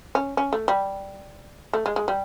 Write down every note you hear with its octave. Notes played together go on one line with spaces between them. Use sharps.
C#4
C#4
A3
G3
A3
G#3
G#3
G3